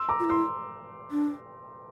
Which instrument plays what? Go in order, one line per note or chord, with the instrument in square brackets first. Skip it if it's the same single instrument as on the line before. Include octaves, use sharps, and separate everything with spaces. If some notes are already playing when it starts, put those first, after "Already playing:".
Already playing: [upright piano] C6 E6
A#5 D6
[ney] F4
E4
[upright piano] C6 E6
[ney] D4